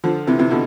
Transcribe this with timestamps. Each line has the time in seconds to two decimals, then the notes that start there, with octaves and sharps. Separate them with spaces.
0.04 D3 F3
0.27 C3 E3
0.39 C3 E3
0.51 B2 D3